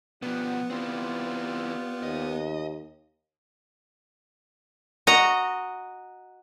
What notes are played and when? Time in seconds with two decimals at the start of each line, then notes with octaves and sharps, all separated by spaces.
0.22 B2 F3 B3 G4 D5 F#5
0.70 E3 C4 F4 G4 D5
2.03 D#2 D#5
5.07 F#4 D#5 A#5